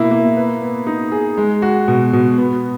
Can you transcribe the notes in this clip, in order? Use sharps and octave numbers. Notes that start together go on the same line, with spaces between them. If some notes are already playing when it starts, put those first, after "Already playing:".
Already playing: B2 A#3 E4
A#3
B4
B3
D#4
G#4
G#3
F#4
B2
B2
B3